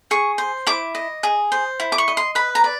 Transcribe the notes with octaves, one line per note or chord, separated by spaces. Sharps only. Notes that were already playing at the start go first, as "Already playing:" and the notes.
G#4 C#6
C5
E4 D6
D#5
G#4
C5
E4
D6
C#6
D#5
C6
B4 B5
A#5
D5